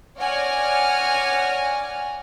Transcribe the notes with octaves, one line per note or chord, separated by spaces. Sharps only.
C#5 D5 F#5 G#5 F6 A#6